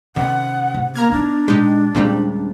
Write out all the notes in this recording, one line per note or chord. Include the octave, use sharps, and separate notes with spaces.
C3 D#3 C#4 F#5
C#3
A#3 A#5 F6 G#6
B3 D4 D#4
A#2 G#3 D#4 G4
D#2 A#2 C#3 G3 G#3 C4 G4